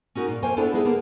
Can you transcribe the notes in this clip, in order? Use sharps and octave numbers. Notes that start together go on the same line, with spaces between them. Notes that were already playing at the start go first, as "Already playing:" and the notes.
C#4 D#4 F#4 A#4
A#2
F2 A#3 C5 C#5 G#5
B3 D4 E4 F4 A4 D5
B3 D#4 E4 G#4
D3 A#3 B3